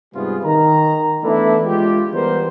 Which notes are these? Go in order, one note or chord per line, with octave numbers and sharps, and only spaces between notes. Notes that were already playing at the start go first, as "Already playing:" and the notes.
G#2 C3 G3 B3 F4 G#4
D#3 A#5
E3 A3 B3 D4 E4
G#3 F4 G4
E3 G3 B3 A#4 C5